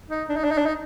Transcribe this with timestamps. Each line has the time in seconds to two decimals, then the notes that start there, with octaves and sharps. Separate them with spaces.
0.10 D#4
0.29 D4
0.36 D#4
0.44 D4
0.51 D#4
0.58 D4
0.66 D#4